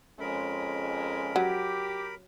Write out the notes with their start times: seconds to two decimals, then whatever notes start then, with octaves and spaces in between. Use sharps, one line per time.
0.20 F2 G#3 C#4 A#4 B5
1.36 F#3 G4